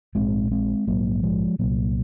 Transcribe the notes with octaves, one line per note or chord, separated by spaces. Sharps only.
A#1 G#2 G#3 C4
G#3 C4
A#1 G#2 F#3 A#3
F3 G#3
C2 A#2 F#3 A#3